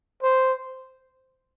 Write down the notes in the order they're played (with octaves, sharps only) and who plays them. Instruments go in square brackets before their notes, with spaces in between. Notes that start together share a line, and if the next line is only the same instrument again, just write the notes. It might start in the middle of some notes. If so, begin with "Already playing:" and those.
[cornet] C5